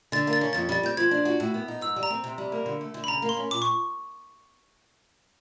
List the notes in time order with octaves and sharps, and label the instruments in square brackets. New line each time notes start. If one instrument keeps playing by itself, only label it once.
[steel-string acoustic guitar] D3 [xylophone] A6
[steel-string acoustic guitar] A#3
[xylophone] A6
[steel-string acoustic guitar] C#4
[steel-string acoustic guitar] F2 [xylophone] A6
[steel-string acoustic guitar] G3 [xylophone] A6
[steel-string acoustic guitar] C4 [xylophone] G6
[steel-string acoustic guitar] F3 [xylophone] G#6
[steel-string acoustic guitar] D4
F#4
A2
B3
D#4
[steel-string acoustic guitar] G#2 [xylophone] E6
[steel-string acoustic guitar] G3
[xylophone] A#5
[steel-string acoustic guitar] C4
C3
G3
A#3
D3
A3
D3
[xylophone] B5
[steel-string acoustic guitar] C#3 [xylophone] A#5
[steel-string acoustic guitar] A#3
[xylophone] C6
[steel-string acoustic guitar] C#4
[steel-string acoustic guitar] A#2 [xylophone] D6
[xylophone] C#6